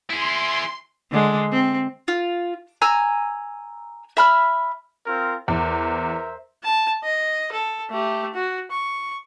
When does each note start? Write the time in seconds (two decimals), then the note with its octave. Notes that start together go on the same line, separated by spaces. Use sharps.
0.10 E4 G#4 C6
1.11 D3 G#3
1.52 C4
2.08 F4
2.82 G#5 A#5 E6
4.17 E5 B5 F6
5.06 C4 F4 A#4
5.48 E2 A#4 C5 E5
6.63 A5
7.04 D#5
7.52 A4
7.91 A3 G4
8.34 F#4
8.71 C#6